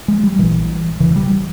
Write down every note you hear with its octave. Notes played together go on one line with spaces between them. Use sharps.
G#3
G3
A#1 A#2 E3
E1 D#2 C#3 E3
G3